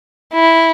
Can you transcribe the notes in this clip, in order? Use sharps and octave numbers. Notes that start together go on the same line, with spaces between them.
E4